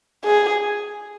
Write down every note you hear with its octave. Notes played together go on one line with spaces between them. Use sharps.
G#4